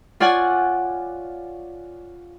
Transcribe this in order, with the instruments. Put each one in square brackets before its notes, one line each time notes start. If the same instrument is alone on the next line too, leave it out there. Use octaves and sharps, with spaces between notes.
[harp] F4 C#5 D5 F#5 G#5